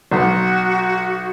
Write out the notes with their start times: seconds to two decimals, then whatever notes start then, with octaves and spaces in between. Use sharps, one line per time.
0.12 B1 F#4